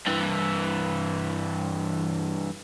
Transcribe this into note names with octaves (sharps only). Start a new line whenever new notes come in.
G2 E3